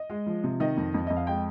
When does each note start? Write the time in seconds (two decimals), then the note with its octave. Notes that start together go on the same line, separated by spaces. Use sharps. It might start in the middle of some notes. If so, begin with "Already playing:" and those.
Already playing: D#5
0.10 G#3
0.26 F3
0.44 C3
0.60 D#3 D#5
0.77 F2
0.94 F2
1.07 F2 D#5
1.16 F5
1.27 G#3 G5